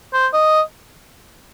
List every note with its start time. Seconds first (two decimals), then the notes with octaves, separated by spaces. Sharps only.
0.13 C5
0.33 D#5